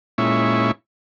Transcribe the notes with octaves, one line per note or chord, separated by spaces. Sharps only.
A#2 G#3 C#4 E4 E5 C#6